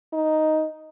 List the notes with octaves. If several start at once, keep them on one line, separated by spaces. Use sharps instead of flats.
D#4